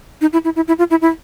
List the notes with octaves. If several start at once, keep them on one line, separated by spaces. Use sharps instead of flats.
D#4
E4
E4
E4
E4
F4
E4
E4